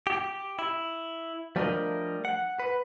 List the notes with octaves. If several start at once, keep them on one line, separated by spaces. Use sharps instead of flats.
G4
E4
F3 G3 A3 D4 A#4 D#5
F#5
B4